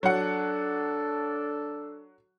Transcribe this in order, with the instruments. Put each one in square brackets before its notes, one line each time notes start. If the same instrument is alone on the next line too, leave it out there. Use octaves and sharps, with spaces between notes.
[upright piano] F#3 F#5 [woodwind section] D4 A4